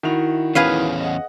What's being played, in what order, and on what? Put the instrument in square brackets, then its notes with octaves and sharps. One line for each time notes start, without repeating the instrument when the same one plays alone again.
[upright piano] D#3 F#4 F7 [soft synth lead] E4
[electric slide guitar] E2 B3 C#4 [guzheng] G#4 B4 F5
[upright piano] D#5 F#5